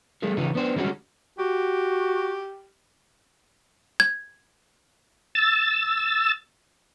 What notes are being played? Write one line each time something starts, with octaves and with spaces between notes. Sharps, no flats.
G3 A3 G#4 A#4
C#3 E3 D#4 F4
B3 D4 C5
D3 G3 G#3 C#4 F#4
F#4 G4
G#6
E6 A6